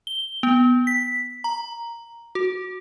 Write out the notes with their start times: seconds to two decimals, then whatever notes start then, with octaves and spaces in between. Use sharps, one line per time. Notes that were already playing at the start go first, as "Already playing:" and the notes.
0.07 G7
0.43 B3
0.87 B6
1.44 A#5
2.35 F#4